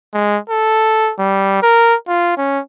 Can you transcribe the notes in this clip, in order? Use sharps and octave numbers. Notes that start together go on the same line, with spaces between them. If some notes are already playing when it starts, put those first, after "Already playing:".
G#3
A4
G3
A#4
F4
C#4